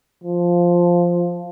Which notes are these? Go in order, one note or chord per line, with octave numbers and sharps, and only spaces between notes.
F3